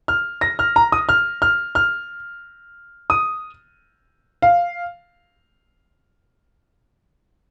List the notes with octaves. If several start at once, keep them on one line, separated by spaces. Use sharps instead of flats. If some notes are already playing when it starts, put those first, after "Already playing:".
F6
A#6
F6
A#5
D#6
F6
F6
F6
D#6
F5